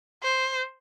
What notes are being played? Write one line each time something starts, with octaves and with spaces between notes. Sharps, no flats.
C5